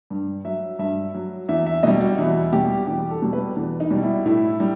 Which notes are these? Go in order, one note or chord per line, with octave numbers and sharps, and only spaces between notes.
G2
F#3 E5
G2 E5
F#3
E2 E5
E5
B2 G3 D#5
F#4
E2 E4
B2 G3 G4
E2 G4
A4
B2 G3
B4
E2
D#4
B2 G3
E4
A2 E4
G3